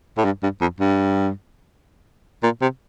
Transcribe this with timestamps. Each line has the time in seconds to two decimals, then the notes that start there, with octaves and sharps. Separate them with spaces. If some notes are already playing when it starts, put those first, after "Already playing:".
0.17 A2
0.25 G2
0.43 G2
0.61 F2
0.80 G2
2.43 A#2
2.62 C3